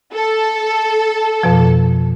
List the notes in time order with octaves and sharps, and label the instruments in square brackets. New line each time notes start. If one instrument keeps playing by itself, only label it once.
[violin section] A4
[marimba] F2 B2 F3